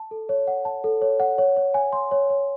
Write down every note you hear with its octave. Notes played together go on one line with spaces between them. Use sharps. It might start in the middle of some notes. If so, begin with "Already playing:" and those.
Already playing: A5
A4
C#5
F#5
A5
A4
C#5
F#5
C#5
C#5
G#5
C6
C#5
C#5